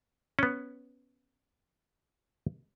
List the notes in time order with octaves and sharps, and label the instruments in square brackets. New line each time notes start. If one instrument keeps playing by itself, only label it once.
[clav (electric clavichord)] B3 C#4